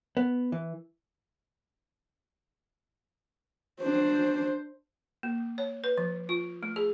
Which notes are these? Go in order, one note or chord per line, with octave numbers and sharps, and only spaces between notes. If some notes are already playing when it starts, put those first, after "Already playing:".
B3
E3
D4 C5
A#3
C#5
B4
F3
F4
A3
G#4